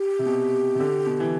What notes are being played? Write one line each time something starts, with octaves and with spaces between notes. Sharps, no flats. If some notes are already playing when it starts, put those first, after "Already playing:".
Already playing: G4
C3
B2
C3
D3
B2
E3